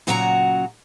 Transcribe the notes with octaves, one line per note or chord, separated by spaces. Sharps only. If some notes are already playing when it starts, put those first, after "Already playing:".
A#2 C#3 F#3 F#4 F#5 A#5